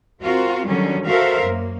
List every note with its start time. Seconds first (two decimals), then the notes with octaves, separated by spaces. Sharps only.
0.21 C4 F4 F#4 A#4
0.66 D3 D#3 F#3 G3 C#4
1.07 F#4 A4 A#4 C5 E5 F5
1.41 F#2 A#3